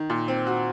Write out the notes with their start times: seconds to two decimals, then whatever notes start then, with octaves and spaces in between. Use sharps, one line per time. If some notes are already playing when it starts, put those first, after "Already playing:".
Already playing: D#3
0.10 A#2
0.28 C4
0.47 F#4